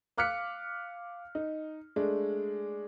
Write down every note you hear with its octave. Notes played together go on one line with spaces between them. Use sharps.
F5 D6 F6 F#6 B6 C#7
D#4
G#3 A3 D4